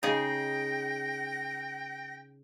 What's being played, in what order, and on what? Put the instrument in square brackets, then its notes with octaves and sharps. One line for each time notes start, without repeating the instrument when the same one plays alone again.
[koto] C#3 D#4 G#4 [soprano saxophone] G5 [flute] A#6